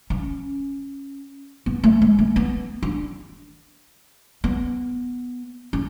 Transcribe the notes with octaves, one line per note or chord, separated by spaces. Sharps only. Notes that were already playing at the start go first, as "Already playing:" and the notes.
C#4
B3
A3
G#3
A3
B3
D4
B3
C#4